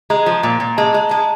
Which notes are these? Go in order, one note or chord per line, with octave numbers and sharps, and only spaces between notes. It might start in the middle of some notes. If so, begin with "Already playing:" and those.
G#3 A#5
F3
A#2
A#2
G#3 A5
G#3
G#3 A5